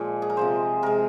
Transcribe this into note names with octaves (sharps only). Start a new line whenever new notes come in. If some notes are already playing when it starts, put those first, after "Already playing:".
Already playing: A#2 F3 G#3
G#4
A#4
C3 F3 G#3 C5
C3 G#3 A#4